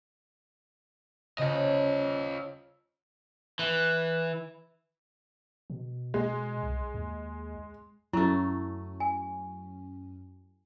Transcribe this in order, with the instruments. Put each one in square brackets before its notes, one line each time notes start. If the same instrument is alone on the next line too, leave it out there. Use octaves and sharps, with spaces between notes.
[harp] C#3 C5 [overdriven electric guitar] F4 D#5
[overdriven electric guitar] E3
[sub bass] B2
[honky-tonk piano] G#3
[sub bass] C2
D#2
[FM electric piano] F#2 C#4 [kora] F#3 A3 [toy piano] E4
[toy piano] G#5